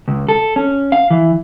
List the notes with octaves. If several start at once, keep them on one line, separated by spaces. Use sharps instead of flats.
C#2
A4
C#4
F5
E3